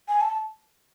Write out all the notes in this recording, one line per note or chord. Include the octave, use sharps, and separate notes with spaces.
G#5
A5